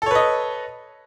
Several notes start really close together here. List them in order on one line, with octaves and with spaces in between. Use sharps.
A4 C#5 B4 D#5